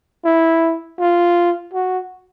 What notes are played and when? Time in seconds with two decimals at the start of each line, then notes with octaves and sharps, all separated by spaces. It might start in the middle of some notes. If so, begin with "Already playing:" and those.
0.25 E4
1.00 F4
1.74 F#4